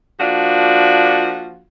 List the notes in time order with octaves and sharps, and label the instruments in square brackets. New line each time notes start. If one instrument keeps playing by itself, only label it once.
[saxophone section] F3 A#3 D4 F4 F#4